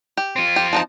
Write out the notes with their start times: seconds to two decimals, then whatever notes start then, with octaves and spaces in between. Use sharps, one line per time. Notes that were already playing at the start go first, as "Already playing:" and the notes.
0.17 G4
0.36 C4 F4
0.56 G4
0.73 F3 D#4 A5